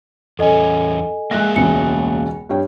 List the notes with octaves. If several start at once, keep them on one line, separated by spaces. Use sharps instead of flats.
E2 C#4 A4 D#5 G#5
G#3 A#3 G#4 E5 F#6 A#6
E1 C#2 C#3 G#5 C#7
G2 C#5 G5